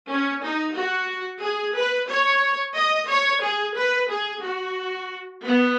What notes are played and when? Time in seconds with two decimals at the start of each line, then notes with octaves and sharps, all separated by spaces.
0.09 C#4
0.42 D#4
0.75 F#4
1.42 G#4
1.75 B4
2.09 C#5
2.76 D#5
3.09 C#5
3.43 G#4
3.76 B4
4.10 G#4
4.43 F#4
5.44 B3